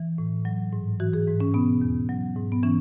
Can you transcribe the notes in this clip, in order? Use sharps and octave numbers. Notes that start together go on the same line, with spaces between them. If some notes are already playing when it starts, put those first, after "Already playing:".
Already playing: E3
A2
F#3
G#2
E3 F#4
G#4
G#2
C#4
B2 B3
E2
F#3
G#2
B3
E3 C#4